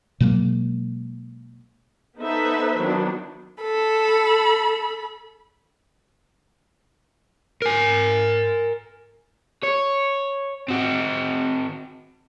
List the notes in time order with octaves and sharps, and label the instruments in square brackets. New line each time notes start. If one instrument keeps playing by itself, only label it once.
[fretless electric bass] B2 F#3 G#3 A#3
[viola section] B3 D#4 A4 B4 C5 E5
D#3 F#3 B3 D4
[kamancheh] A4 B5
[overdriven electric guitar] A#4 G#5
C#5
C4 F#4